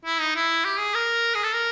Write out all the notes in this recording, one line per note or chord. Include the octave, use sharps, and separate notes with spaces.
E4
D#4
E4
G4
G#4
A#4
G#4
A4
A#4